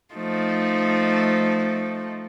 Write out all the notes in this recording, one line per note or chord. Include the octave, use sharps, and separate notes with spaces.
F3 A3 D#4